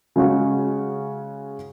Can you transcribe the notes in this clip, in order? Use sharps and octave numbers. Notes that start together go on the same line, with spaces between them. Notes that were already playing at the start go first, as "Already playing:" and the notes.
C#3 G#3 C#4 F#4